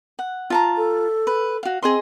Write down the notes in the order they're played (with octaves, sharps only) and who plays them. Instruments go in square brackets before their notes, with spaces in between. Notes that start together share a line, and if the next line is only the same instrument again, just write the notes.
[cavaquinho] F#5
F4 A5 A#5
[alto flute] A4
[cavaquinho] B4
F#4 F5
[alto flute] C4 [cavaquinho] G#4 D#5 C6